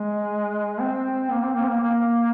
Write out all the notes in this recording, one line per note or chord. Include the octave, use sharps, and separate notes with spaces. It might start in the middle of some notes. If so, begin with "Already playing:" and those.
Already playing: G#3
C4
A#3
C4
A#3
C4
A#3
A#3